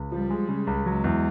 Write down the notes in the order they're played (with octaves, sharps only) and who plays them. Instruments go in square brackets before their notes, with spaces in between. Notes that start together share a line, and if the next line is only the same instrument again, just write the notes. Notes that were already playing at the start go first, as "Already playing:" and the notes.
Already playing: [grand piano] C#2
[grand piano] F3 [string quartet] G3
[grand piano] G#3
C#3
C#2
[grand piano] F#3 [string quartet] G#3
[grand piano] E2